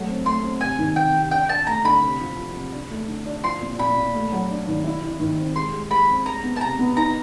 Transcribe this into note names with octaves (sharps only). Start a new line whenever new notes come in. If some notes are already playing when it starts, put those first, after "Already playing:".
Already playing: F#3 A3
C4
A3 C6
C4
C3 G#5
D#3
C3 G5
C3
D4 G5
D4 A5
A3 A#5
D3 B5
C3
F3
F3
C3
D4
A3
D3
D4
F3 C6
A#2
A#2 B5
A#2
A3
F#3
D4
D#3
E4
E4
D#3
C4
G#3 C6
G#3
G#3 B5
C4
G#3 A#5
B3
A5
C3 A#5
B3
D#4 A#5